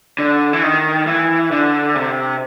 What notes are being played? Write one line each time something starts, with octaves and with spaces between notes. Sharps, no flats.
D3
E3
D#3
E3
D3
C3